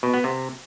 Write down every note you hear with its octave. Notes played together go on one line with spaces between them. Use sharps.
B2
B3
C3